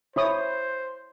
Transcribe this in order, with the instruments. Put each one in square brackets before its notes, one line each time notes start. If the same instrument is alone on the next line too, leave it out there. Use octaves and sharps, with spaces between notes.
[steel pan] E4 C#5 D#6 [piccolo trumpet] C5